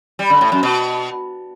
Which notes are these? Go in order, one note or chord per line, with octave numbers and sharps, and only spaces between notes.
G3
D3
A2
F#2
B2